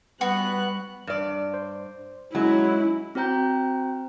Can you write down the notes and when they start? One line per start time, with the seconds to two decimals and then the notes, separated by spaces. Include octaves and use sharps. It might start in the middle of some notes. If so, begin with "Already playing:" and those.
0.21 G3 B3 F#4 F#6
1.07 G2 D5
1.54 C5
2.35 F#3 G#3 C#4 E4
3.15 C4 F#4 C5 G5 A#5 G6